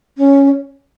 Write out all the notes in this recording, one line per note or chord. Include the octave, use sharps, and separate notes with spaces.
C#4